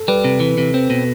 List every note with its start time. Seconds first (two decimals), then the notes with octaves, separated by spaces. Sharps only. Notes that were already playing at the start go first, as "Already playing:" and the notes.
Already playing: A4
0.08 G3 B4
0.24 C3
0.40 E3
0.58 C3
0.74 C4
0.90 B2